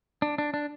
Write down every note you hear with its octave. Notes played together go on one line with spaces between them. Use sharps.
D4
D4
D4